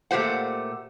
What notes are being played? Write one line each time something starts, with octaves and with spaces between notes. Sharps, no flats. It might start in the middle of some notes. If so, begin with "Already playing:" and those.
A#2 A3 G4 C5 F#5